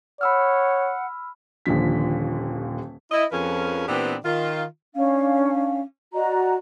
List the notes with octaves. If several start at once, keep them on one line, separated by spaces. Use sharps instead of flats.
C#5 F#5 B5 E6 F6
D#1 D#2 D3 F3 B6
E4 D#5
F2 F3 C#4 G#4 A#4 B4
A#2 E3 B3 C4 D4 G4
D#3 F4
C#4 D4 F5
F#4 D5 D#5 A#5